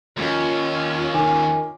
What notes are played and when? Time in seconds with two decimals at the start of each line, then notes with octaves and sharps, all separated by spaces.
0.17 D#2 C#4 F4
1.14 D#3 G#5 D6